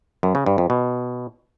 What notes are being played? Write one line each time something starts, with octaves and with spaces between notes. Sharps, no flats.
F#2
C#3
G2
F2
B2